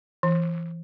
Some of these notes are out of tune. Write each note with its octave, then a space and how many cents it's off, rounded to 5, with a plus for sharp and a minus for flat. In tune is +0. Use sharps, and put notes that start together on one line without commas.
E3 +20